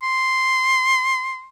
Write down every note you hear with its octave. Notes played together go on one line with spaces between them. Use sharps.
C6